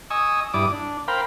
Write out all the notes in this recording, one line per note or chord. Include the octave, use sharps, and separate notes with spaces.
D#5 G#5 C#6 D#6 E6
G2 E4 D5 D6 D#6
D4
A#4 C5 F5 G5 B5